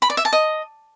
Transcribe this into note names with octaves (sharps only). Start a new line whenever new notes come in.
B5
D5
E5
A5
D#5